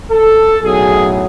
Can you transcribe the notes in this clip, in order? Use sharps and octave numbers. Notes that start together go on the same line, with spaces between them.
A4
B1 A2 F#3 G#4